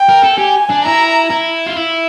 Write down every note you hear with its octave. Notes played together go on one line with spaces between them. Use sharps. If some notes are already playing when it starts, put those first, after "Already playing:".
Already playing: G5
A#4
A4
G4 G#5
D4
E4 A#5
E4
F4
E4